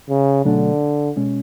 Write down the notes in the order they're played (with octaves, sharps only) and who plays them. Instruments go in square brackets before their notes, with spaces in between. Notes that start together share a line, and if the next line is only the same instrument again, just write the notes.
[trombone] C#3
[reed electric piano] B2 F#3 A3 D4 [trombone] D3
[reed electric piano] B2 G#3 C#4